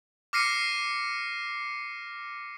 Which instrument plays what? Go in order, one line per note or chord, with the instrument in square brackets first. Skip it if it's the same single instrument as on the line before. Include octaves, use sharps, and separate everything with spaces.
[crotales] D6 F6 A#6 C7 C#7 D#7